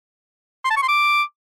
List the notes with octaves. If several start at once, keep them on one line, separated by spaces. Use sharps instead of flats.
C6
A5
C#6
C6
D6